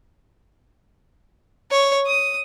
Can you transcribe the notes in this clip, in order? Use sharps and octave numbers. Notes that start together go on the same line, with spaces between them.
C#5
D#6